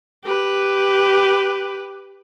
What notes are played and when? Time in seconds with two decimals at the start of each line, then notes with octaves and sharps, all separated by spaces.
0.24 G4 B4